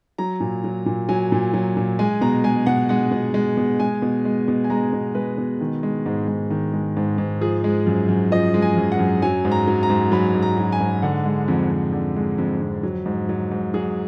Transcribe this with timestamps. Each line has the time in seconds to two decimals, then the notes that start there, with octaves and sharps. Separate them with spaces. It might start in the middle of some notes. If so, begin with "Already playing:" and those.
0.18 F#3 A#5
0.40 A#2
0.64 F#3
0.86 A#2
1.09 F#3 G#5
1.32 A#2
1.54 F#3
1.77 A#2
1.99 G#3 G#5
2.21 B2 A#5
2.44 G#3 G#5
2.66 B2 F#5
2.89 G#3 F#5
3.11 B2
3.34 G#3
3.57 B2
3.80 G#3 G#5
4.02 B2
4.25 G#3
4.48 B2
4.64 G#5
4.70 G#3 A#5
4.93 B2
5.15 G#3 B4
5.38 B2
5.61 D#3
5.83 G#3
6.06 G#2
6.28 G#2
6.50 D#3
6.73 G#3
6.97 G#2
7.18 G#2
7.41 F3 G#4
7.64 G#3
7.86 F#2
8.09 F#2
8.31 F3 D#5
8.54 G#3
8.62 G#5
8.76 F#2
8.92 F#5
8.99 F#2
9.22 F#3 G#5
9.45 G#2
9.51 A#5
9.68 F#3
9.83 A#5
9.90 G#2
10.12 F#3 B5
10.34 G#2
10.43 A#5
10.58 F#3
10.72 G#5
10.80 G#2
11.02 D3 F#5
11.25 G#3
11.48 F2
11.71 F2
11.93 D3
12.16 G#3
12.38 F2
12.61 F2
12.83 F#3
13.06 G#2
13.29 F#3
13.51 G#2
13.74 F#3 G#4